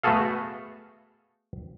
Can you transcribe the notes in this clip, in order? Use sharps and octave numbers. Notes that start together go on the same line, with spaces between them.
A3 B3 F#4 G#4 A4 F5